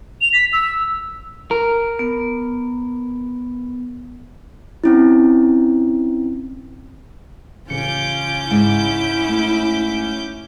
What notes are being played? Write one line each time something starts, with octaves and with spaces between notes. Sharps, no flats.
F7
B6
E6
A#4
B3
C4 C#4 E4
A1 C#3 C#4 F4 D6 G6 C#7
G#2 E4
A3